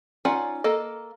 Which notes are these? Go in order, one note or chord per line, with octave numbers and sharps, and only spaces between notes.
C#4 D#4 F4 D5 F#5
A#3 A4 D#5